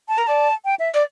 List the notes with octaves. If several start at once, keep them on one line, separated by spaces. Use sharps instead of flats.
A5
A#4 A#5
D5 A5
G5
E5
D5